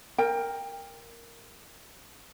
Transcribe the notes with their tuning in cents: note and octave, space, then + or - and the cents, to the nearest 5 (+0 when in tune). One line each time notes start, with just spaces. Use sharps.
A#4 +0 G5 +20